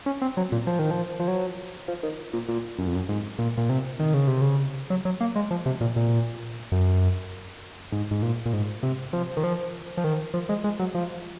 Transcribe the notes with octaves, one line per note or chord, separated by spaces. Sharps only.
C#4
C4
F#3
A#2
F3
D#3
F3
F3
F#3
F3
D#3
A#2
A#2
F#2
F2
F#2
G#2
A#2
A#2
C3
D#3
C#3
C3
C#3
F#3
F#3
A#3
G#3
F3
C3
A#2
A#2
F#2
G#2
G#2
A#2
A#2
G#2
C3
F3
D#3
F3
F3
D#3
F3
G#3
G#3
F#3
F3